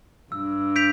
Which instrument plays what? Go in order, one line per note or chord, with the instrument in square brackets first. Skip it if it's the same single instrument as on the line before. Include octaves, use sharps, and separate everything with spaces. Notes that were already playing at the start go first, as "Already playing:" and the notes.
[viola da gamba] G2 [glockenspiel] E6
[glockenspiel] G6 B6 D7 F7